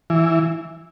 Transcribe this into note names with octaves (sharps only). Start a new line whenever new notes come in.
E3